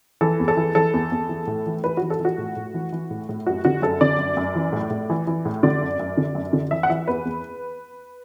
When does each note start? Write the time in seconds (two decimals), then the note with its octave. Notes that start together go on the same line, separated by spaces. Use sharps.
0.21 E3 A4
0.40 E2
0.48 A4
0.57 E3
0.75 E3 A4
0.94 E2
1.12 E2
1.29 E3
1.47 A2
1.66 E3
1.84 E3 B4
1.97 E3 F#4
2.10 A4
2.20 E3
2.25 F#4
2.38 A2
2.56 A2
2.74 E3
2.92 E3
3.10 A2
3.29 A2
3.46 F#2 F#4
3.65 D3 F#4
3.82 F#2 A4
4.01 D3 D5
4.19 F#2
4.37 F#2
4.55 E3
4.72 A2
4.90 A2
5.10 E3
5.27 E3
5.45 A2
5.63 D3 D5
5.81 F#2
5.99 F#2
6.17 D3
6.35 F#2
6.53 D3
6.71 E3 E5
6.83 F#5
6.89 E3 E5
7.08 E2 B4
7.25 E2